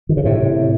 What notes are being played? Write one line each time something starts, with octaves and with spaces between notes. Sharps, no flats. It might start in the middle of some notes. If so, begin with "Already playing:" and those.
D#3
C#3
A2 C3